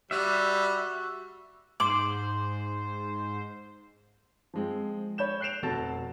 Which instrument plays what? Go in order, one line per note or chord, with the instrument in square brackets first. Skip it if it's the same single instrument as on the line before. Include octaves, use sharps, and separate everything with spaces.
[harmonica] G3 [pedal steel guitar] F#4 E5
[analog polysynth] G#2 [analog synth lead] C5 [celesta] C6 F#7 [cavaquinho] D6
[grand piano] F3 G#3 C4
C#5 B5 G6 E7
F#6 G6 C7 D7 E7 F7
F1 B2 F#4 A4 A6